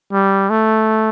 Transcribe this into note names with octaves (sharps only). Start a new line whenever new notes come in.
G3
A3